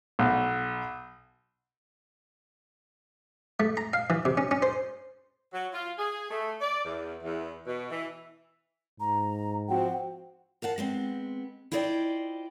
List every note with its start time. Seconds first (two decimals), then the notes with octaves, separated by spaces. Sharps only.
0.19 B1
3.60 A3
3.77 A#5
3.93 F5
4.10 E3
4.25 C3
4.37 C#4
4.51 C#4
4.62 C5
5.54 F#3
5.74 F4
5.99 G#4
6.31 A3
6.61 D5
6.85 E2
7.23 E2
7.67 B2
7.91 E3
9.00 G#2 A#5
9.69 F3 C4 F#4 F#5 G5
10.62 A#4 F5 F#5 A5
10.78 G#3 B3 C4
11.72 E4 F4 C5 D5 D#5 G5